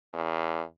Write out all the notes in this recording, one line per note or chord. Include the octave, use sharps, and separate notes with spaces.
E2